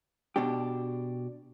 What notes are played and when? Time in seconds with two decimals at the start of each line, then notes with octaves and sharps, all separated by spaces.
0.36 B2 D4 G4